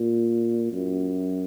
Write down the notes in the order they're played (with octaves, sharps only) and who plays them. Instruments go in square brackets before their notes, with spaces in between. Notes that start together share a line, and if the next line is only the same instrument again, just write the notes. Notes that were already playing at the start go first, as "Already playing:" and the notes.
Already playing: [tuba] A#2
F#2